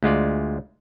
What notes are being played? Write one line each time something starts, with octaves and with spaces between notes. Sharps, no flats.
D2 G#3 F4 D5